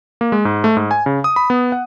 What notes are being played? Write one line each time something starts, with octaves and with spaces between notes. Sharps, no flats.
A#3
G#3
G#2
A3
G#2
G#5
C#3
D#6
B5
B3
F#5